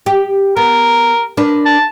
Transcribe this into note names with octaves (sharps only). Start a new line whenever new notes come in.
G4
B3 A#4
D4 A#4 B4
A5